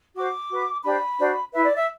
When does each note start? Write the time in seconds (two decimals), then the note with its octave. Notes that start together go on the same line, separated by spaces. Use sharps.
0.14 F#4 C5 D6
0.50 F#4 B4
0.83 D4 G4 C5 B5
1.18 D4 F#4 C5
1.52 E4 B4 E5
1.64 D5
1.76 E5